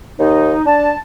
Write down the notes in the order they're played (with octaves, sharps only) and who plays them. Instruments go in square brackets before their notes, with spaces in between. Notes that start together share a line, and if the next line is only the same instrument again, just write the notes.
[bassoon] D#2 [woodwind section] D#4
[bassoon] D4 [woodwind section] A5